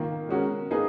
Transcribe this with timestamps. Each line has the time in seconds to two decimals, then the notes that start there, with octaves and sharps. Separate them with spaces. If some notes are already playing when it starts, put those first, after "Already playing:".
Already playing: D#3 A#3 F4
0.29 G#3 C#4 F#4 A#4
0.71 A#3 D#4 G#4 B4